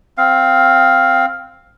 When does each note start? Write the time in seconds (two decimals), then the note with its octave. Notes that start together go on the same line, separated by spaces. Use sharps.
0.18 C4 F5